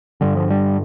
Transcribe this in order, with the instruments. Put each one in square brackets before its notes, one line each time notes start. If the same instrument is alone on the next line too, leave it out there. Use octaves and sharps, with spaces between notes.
[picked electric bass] G2 D3 G3
F3
G3